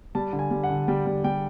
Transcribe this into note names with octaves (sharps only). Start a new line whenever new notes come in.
G3 A5
D3
G#5
G3
F#5
D3
G3 G5
G3
G3 G5